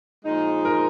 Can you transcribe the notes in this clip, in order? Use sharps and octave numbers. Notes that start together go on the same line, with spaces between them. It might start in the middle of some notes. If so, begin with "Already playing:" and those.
A#2 F3 G#3 D#4
A#4